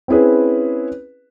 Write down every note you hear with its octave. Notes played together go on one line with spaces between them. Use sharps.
C4 C#4 E4 G#4 B4